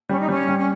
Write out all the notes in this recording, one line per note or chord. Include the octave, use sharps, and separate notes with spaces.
G3 C#4
D#4
G3 C#4
G3
C#4